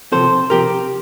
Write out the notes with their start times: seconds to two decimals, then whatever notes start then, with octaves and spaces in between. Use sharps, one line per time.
0.12 C3 F3 C4 A4 C5
0.50 C3 F3 C4 G4 A#4